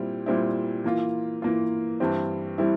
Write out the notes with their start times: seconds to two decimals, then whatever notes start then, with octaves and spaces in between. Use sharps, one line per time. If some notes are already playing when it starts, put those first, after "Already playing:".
Already playing: A#2 G3 C4 E4
0.26 A#2 G3 C4 E4
0.84 E3 A#3 F4
1.42 E3 A#3 F4
2.00 G2 E3 G3 C4 E4
2.58 E3 G3 C4 E4